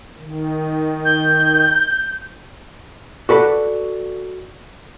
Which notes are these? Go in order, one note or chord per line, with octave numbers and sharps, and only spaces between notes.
D#3
G6
F#4 A4 B4 D5